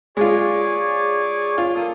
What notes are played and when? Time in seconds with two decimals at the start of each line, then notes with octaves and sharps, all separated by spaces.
0.17 G#3 F4 G#4 C#5 D5
1.58 F4
1.75 A#3 A4 D#6